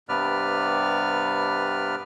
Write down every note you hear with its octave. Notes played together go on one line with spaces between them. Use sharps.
G2 C3 B3 B4 D5 F6